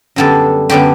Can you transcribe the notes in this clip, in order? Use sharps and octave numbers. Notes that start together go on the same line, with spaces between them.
F#2 D3 G3 B3 A4
F#2 D3 G3 B3 G4